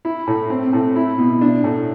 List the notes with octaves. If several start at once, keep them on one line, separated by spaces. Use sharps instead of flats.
E4
A2
C4
A2
E4
B2
D4
A2